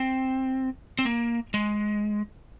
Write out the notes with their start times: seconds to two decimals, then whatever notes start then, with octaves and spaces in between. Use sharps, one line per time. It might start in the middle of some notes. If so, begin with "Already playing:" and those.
Already playing: C4
0.99 C4
1.05 A#3
1.54 G#3